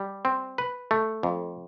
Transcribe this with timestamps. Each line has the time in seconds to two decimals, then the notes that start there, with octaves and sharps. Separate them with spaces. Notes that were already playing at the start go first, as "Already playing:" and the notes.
Already playing: G3
0.25 C4
0.58 B4
0.91 A3
1.23 F2